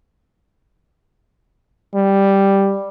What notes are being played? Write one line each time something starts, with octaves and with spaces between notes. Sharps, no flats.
G3